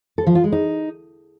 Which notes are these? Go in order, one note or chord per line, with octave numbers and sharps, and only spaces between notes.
A4
F3
F4
G#3
D#4